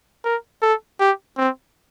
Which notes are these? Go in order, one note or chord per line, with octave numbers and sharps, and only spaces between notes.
A#4
A4
G4
C4